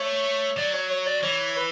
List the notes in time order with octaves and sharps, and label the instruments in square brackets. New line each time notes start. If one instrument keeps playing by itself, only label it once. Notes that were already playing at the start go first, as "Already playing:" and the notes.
Already playing: [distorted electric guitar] A3 [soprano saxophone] C#5
[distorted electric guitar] F#3 [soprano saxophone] D5
[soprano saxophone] C#5
C#5
D5
[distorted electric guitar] E3 [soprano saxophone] C#5
[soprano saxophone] B4